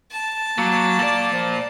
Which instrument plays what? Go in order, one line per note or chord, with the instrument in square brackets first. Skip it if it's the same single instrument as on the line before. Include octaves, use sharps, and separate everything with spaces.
[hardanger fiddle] A5
[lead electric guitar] F#3 [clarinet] A#3
[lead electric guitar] A#2 D5
[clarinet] F3